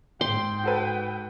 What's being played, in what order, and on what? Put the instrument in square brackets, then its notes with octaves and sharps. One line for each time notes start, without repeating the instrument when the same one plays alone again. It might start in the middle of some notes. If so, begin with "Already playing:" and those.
[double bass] G#2 [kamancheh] G5 [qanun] C6
[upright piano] F#4 A4 B4